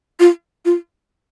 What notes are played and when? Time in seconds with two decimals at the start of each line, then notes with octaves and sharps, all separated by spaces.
0.20 F4
0.65 F4